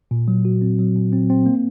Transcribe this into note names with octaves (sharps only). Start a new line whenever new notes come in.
A#2
F#3
F#4
C4
F#3
A#2
C4
C4
A#3